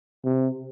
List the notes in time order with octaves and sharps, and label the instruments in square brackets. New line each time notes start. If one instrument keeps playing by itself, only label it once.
[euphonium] C3